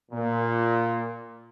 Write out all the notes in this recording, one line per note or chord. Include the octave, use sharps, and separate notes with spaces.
A#2